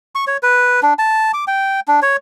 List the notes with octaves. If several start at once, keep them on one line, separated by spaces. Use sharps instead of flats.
C#6
C#5
B4
D4
A5
D6
G5
D4
C#5